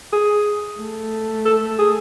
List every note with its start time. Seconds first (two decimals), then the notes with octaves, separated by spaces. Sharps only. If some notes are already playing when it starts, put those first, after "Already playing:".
0.13 G#4
0.79 A3
1.46 A4
1.79 G#4